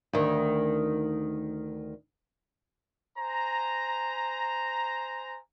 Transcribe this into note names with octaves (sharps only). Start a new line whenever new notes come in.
D2 D#3
C5 G#5 A#5